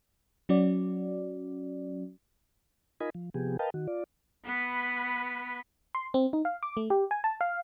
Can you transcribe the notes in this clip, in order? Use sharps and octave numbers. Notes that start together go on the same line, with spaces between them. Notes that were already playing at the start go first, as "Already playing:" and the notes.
F#3 C#4 F#4 D5
D#4 F4 A#4 D#5 G#5 B5
F3
C3 F3 B3 G4 G#4
A#4 B4 D#5 F5 G5 A5
D#3 F#4
F4 D5
B3 B4
C6
C4
D#4
F5
D6
A3
G4
G#5
A5
F5